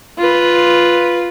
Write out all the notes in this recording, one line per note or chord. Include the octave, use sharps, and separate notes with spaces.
F4 B4